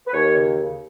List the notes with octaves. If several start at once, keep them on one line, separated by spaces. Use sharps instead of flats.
B4
D#2 C#5
C#3
C#3